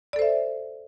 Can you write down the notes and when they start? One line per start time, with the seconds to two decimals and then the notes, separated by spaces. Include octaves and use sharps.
0.13 D5
0.16 A4
0.19 C5
0.22 E5